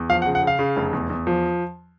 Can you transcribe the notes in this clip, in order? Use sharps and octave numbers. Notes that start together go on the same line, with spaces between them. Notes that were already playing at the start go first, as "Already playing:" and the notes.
Already playing: E2
F3 F5
F#5
C#3
F#5
C#3 F5
C#3
F1
E2
E2
F3